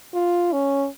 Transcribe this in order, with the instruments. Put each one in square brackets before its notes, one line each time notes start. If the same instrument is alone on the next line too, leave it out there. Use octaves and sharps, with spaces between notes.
[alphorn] F4
C#4